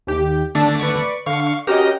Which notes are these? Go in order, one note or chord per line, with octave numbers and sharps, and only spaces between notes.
D#2 G4
D3 A3 D4 A6
B4 D5 C#6
D3 F5 C#6
C#4 F#4 G4 A#4 D#5